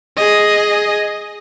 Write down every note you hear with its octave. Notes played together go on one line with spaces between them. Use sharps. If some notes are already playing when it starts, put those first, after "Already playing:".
G#4 D#5